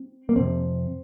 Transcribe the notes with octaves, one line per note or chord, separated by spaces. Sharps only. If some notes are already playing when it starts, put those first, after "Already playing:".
Already playing: C4
A#3
F2 C3 C4